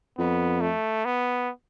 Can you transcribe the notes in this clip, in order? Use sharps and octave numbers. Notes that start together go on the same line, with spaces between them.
F2 B3
A3
B3